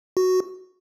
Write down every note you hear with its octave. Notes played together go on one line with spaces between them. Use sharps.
F#4